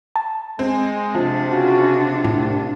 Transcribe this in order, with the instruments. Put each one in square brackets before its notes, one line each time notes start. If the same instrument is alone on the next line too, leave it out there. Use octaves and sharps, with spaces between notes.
[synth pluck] A5
[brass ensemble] G#3 [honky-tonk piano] C4
[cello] C3 D4 [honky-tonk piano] F3
[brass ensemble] C#3 F#4
[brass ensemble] C2 [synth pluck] A2